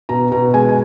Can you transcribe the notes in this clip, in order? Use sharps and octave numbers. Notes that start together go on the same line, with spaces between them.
B2 A#5
B2 A#5
G#3 G#5
G#5